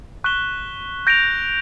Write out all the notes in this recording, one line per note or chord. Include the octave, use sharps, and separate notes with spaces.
C#6 F#6 B6 E7 G7
G6 A#6 D7 F7